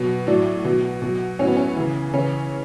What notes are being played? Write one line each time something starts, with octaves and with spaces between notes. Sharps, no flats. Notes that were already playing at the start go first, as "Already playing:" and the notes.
Already playing: B2 F#3
A2 F#3 D4
B2 F#3
B2 F#3
A2 F#3 C#4
B3
C#4
C#3 E3
C#3 E3 C#4